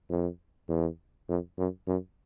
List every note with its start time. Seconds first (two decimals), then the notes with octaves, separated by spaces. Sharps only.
0.09 F2
0.69 E2
1.29 F2
1.58 F#2
1.88 F#2